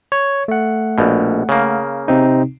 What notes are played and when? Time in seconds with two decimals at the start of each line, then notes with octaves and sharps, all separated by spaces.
0.12 C#5
0.48 A3 F#5
0.98 A#1 B2
1.49 C#3 A#3
2.08 C3 C4 D#4